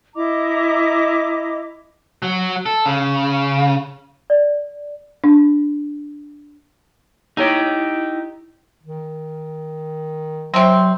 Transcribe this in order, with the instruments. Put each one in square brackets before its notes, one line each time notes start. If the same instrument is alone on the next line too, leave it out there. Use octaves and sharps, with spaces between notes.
[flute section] E4 D#5 A#5 D6
[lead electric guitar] F#3
A4
C#3
[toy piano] D5
[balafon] D4
[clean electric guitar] D#4 G4 [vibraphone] E4 [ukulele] C#5 A#5
[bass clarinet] D#3
[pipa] C3 C4 [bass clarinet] F#3